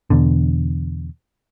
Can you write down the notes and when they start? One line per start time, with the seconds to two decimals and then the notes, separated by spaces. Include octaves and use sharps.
0.10 E2 B2 D3